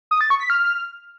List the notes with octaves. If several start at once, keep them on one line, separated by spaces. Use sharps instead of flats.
D#6
A6
C#6
B6
F6